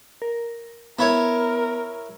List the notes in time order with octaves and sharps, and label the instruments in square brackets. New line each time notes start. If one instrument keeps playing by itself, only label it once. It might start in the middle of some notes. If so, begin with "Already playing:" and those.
[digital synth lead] A#4
[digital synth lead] B3 [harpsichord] E4 C#5 [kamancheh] A#4